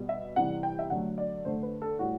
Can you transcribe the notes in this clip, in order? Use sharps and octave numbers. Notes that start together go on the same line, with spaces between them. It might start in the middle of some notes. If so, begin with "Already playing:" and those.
Already playing: B2 G3
E5
C3 E3 G3 F#5
G5
E5
D3 F#3 A3 F#5
D5
D3 A3 C5
B4
A4
A2 G3 F#4